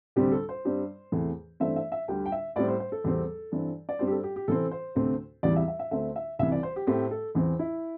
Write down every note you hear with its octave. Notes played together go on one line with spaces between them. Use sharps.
D2 C3 G3 C4 G4
A4
C5
G2 G3 C4
E2 C3 E3 A3
G2 E3 A3 C4 E5
E5
E5
D2 D3 G3 D4 G5
G5
E5
A2 G3 C4 D5
C5
C5
A4
E2 C3 G3 C4
G2 E3 C4
D5
G2 G3 C4 C5
G4
A4
G4
G4
C3 E3 C4 A4
C5
D2 C3 A3 C4
E2 C3 E3 G3 D5
E5
E5
E5
D2 D3 A3 C4 E5
E5
C2 C3 E3 E5
D5
C5
G4
A2 A3 C4 G4
A4
E2 E3 C4
E4